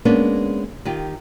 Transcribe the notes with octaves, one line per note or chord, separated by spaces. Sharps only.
G#3 A#3 B3 C#4 D4
D#3 F4 G4